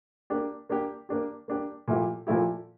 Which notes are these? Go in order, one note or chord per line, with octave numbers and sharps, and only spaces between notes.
A#3 D4 G4
A#3 D4 G4
A#3 D4 G4
A#3 D4 G4
A#2 F3 A3 E4 G4
A#2 F3 A3 E4 G4